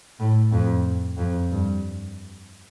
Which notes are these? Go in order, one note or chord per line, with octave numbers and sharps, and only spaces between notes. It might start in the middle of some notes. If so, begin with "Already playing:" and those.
A2
F2
F2
G2